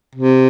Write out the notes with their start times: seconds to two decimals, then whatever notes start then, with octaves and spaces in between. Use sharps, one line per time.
0.15 C3